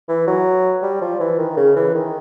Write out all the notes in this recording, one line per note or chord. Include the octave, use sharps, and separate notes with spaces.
E3
F#3
G3
F3
E3
D#3
C#3
E3
D#3